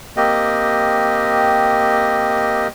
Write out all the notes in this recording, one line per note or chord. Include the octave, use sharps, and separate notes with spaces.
A#3 C4 G4 D#5